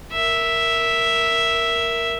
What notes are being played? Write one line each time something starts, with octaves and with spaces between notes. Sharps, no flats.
A#4 E5